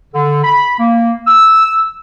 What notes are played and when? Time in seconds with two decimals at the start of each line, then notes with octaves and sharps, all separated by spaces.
0.13 D3
0.44 B5
0.79 A#3
1.27 E6